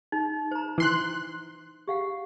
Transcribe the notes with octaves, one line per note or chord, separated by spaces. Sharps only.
D#4
C5 A#5
E3 C6 F#6
G4 F5 F#5